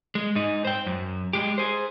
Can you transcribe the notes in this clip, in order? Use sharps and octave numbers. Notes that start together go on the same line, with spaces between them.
G#3
G#2 D#4
C5 G5
F#2
G#3 G4
G#4 C5